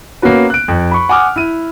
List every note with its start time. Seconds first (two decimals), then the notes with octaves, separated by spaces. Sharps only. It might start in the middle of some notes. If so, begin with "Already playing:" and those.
0.22 A#3 B3 C#4 F#4 B4
0.50 F#6 D7
0.68 F2
0.91 B5 C#6
1.09 F#5 G#5 D6 D#6 F6
1.36 E4 D#7